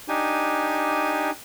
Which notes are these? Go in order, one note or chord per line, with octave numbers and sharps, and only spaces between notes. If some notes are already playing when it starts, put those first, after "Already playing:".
D4 D#4 G4 G#5